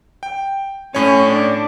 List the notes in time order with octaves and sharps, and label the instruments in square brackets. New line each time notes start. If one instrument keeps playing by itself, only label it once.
[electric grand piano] G5
[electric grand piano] A2 C#5 [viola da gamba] C#4
[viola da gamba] D4